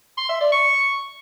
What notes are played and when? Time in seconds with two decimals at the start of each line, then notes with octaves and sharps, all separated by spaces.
0.17 C6
0.29 E5
0.41 D5
0.52 C#6